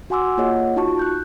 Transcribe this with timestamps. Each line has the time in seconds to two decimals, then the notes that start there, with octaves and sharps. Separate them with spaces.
0.10 F#4 F#5 G#5 C6 D6 E6
0.38 A#3 F4 G#4 C#5 D#5 F#5
0.76 D#4 F4 F#4 A5 C#6
0.99 F#6 G6